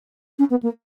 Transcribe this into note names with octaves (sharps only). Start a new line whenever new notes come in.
C#4
B3
A#3